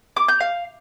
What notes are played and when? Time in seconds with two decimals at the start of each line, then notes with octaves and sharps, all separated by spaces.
0.17 D6
0.28 G6
0.40 F5